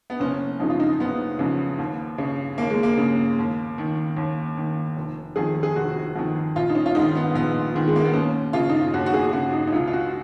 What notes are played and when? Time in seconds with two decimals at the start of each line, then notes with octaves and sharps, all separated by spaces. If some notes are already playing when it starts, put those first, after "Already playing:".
0.10 B3
0.20 F#1 C#4
0.60 F2 C#3 D#4
0.70 F4
0.80 D#4
1.00 F#1 B3
1.39 F2 C#3
1.78 D#2
2.18 C#3
2.58 D#2 A#3
2.70 G#3
2.83 A#3
2.97 C#3
3.38 D#2
3.78 D#3
4.17 D#2
4.57 D#3
4.96 F1
5.36 F2 D#3 G#4
5.63 G#4
5.76 F1 F#4
6.16 F2 D#3
6.56 A#1 F4
6.70 D#4
6.75 C#4
6.86 F4
6.95 G#2 D#3 D#4
7.15 B3
7.35 A#1 B3
7.74 G#2 D#3
7.88 G#3
7.96 A#3
8.05 B3
8.14 D#2 C#4
8.53 C#3 F4
8.69 D#4
8.81 F4
8.94 D#2 F#4
9.06 F#4
9.14 G#4
9.33 C#3 F#4
9.53 D#4
9.67 D#4
9.72 C#2 F4
9.87 F4
9.93 F#4